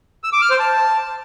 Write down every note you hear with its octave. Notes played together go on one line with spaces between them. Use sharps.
E6
D6
F6
C5
A5